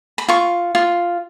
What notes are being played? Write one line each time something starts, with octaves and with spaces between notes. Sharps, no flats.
B5
F4 C#6
F4